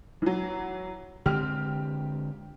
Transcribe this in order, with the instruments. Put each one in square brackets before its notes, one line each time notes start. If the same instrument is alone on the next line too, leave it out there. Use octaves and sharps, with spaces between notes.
[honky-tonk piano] E3 F#3
[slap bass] D3 G#3 C4 [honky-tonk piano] G4 F6